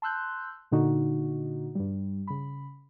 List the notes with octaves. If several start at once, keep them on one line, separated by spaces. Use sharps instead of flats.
A5 C6 E6 F#6 G6
A#2 D3 D#4 F#4
G2 G3
C#3 B5